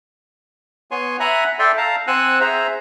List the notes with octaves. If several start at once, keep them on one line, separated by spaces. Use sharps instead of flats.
B3 C#5 G#5 C6
E5 F#5 G#5 A#5 B5 F#6
A4 D5 E5 G5 C6
F5 A5 A#5
C4 F#5 G#5 E6 F#6
G#4 C5 E5 A#5